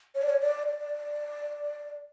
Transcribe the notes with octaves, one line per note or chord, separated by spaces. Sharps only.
C#5
D5
C#5
D5
D5